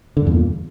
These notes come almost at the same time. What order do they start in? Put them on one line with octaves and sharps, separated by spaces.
D3 G2 E2 A#2